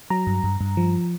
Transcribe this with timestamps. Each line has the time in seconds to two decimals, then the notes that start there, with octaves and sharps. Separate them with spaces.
0.10 F#3 A#5
0.27 G2
0.44 G2
0.61 G2
0.77 F3